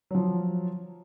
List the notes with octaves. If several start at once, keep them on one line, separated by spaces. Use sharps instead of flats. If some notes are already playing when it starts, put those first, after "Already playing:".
F3 F#3